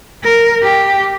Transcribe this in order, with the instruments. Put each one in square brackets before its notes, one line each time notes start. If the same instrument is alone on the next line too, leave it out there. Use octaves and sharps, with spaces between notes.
[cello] A#4
G4